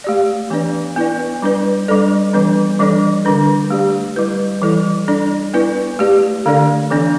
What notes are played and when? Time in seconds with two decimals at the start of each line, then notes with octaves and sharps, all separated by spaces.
0.04 A3 G4 D5
0.50 E3 B3 D4 B4 D5
0.96 B3 E4 B4 D5
1.42 G3 D4 B4 D5
1.88 G3 D4 A4 D5
2.33 E3 G3 B3 D4 B4
2.79 E3 G3 D4 A4 D5
3.25 D3 G3 D4 B4
3.70 A3 G4 D5
4.16 G3 E4 B4
4.62 E3 G3 E4 A4 D5
5.08 G3 D4 A4 D5
5.54 B3 E4 B4 D5
5.99 A3 G4 D5
6.46 D3 A3 D4 A4 D5
6.90 E3 B3 D4 A4 D5